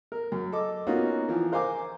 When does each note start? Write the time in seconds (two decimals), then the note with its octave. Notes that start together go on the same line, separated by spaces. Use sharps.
0.12 A#4
0.32 F#2
0.52 A4 D#5 D6
0.87 A#3 B3 C#4 D#4 F4 F#4
1.28 E3 F3
1.52 A#4 C5 F5 G#5 D6